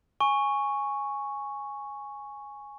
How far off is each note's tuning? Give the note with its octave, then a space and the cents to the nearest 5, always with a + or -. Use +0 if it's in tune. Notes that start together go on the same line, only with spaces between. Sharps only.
G#5 +0 C#6 +0